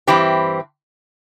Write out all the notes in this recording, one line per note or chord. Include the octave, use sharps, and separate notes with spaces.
G2 E3 C4 G4